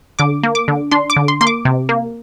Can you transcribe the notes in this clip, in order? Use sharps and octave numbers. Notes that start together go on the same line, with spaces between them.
D3 D6
A#3
D6
D3
D4 C6
D6
D3
C6
A#3 C6
D6
C3
A#3